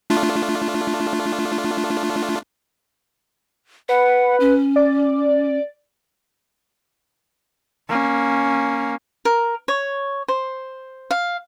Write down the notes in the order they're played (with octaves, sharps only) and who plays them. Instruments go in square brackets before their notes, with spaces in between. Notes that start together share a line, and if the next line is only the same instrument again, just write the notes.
[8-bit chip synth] A3 D4 F4
[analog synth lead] B4 [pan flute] F#5
[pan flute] C#4
[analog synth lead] D5
[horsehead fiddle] A#3 C#4
[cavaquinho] A#4
C#5
C5
F5